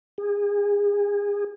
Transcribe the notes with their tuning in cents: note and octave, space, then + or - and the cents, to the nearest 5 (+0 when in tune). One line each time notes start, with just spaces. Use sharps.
G#4 -30